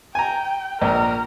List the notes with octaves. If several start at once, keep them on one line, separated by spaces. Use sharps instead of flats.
G5 G#5 A#5
A#1 A#4